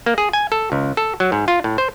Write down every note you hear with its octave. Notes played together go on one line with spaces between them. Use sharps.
A#3
G#4
G#5
A4
C#2
A4
F#3
G#2
F4
A2
C5